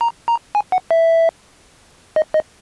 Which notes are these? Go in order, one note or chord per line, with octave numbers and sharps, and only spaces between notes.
A#5
A#5
G#5
F#5
E5
D#5
D#5